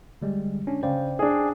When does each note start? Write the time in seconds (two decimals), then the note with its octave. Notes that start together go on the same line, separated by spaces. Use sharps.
0.21 D3 G3 G#3
0.67 C#4 D4
0.83 C#3 C5 D5 G5
1.19 D4 G#4